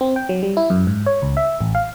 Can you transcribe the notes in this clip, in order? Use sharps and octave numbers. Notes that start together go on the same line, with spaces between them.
C4
G5
F#3
G3
E4
F#2
G#2
C#5
C#2
E5
A1
F5